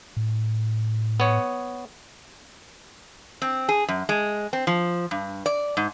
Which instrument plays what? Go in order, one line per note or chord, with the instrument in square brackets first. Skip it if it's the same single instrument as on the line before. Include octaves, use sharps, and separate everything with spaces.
[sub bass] A2
[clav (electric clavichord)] B3 C#5
[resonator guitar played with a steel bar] C4
G#4
F#2
G#3
C4
F3
G2
D5
G#2